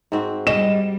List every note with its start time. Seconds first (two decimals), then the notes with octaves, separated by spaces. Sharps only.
0.12 G#2 C4 F#4
0.47 G3 D#5 E7